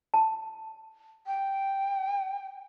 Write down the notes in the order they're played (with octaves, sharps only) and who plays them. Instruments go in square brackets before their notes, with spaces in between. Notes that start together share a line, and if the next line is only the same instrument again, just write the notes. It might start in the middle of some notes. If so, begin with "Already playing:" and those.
[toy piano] A5
[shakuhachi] G5